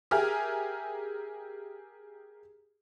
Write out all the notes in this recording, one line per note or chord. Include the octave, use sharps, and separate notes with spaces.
G4 G#4 A#4 E5 G#5 F6